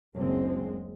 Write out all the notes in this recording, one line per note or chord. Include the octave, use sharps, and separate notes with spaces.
F#1 D2 G#3 C4